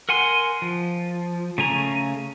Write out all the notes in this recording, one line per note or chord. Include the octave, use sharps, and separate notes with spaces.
A#4 F#5 G#5 C6
F3
C#3 A3 G#5 A#5